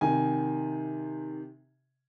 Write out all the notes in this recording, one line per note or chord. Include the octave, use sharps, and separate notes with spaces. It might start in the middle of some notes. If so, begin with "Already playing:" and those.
C3 D#3 G#5